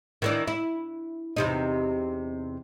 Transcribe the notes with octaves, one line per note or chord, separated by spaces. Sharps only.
D#3 E3 D4
E4
E2 C3 D#4